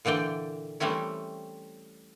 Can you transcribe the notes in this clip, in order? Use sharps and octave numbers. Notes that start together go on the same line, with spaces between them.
A#2 D3 E3 D5 G5
E3 G3 A3 C4 C#4 E4